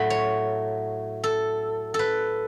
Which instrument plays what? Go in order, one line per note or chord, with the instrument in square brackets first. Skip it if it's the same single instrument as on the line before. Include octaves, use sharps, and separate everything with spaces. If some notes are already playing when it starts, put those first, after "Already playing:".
Already playing: [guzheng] A2 F#3 A3 A5 B5
C#5
A4
A4
B4